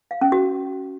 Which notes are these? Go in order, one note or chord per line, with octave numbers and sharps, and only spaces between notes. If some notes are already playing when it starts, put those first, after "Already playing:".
F5
C#4
F#4